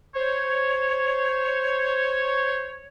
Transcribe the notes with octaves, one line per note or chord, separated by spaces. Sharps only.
C5 C#5